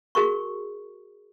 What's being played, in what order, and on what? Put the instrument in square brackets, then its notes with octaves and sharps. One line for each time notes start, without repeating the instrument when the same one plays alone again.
[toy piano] F#4 G#4 A#4 C#6